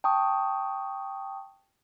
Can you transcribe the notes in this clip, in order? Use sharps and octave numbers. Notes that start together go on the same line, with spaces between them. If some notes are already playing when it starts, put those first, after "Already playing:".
G5 A5 C#6 D#6